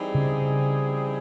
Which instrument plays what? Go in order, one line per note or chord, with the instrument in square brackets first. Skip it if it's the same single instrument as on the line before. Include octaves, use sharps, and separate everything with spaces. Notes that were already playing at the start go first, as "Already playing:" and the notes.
Already playing: [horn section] E3 G3 C4 D#4 G#4
[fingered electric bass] C#3